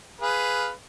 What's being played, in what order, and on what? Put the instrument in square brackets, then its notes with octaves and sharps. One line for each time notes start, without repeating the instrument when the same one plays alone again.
[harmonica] G#4 B4 F5